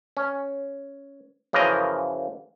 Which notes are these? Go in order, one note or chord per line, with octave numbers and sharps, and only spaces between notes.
C#4
F#2 C#3 E3 F3 A#4 D#5